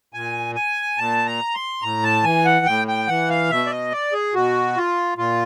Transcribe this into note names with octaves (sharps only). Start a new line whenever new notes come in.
A#2 G#5
G#5
A#2 A5
A#5
C6
A2 A#5
A5
E3 G#5
F#5
A2 G5
G5
E3 F#5
F5
B2 E5
D5
D#5
D5
G#4
B2 F#4
F4
A#2 F4